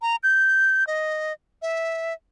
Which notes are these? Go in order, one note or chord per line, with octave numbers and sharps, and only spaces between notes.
A#5
G6
D#5
E5